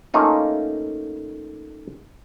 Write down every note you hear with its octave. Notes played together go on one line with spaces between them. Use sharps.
A3 A#3 C#4 D#4 F4